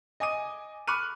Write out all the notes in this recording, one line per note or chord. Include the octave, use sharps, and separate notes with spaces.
D#5 G#5 D6 D#6 D#7
B5 C#6 D6 F6 F#6 D#7